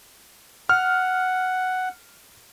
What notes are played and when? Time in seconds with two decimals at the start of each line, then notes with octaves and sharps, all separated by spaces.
0.69 F#5 F6